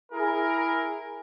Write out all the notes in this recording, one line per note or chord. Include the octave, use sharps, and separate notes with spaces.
E4 G#4 A#4